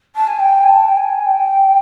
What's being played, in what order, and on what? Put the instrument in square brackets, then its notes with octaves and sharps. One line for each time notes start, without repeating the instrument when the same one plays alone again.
[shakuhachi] A5
G#5
G5
G#5
A5
G5
G#5
G5